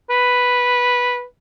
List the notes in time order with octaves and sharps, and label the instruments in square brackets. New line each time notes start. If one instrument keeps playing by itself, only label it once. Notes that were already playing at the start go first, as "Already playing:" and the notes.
[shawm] B4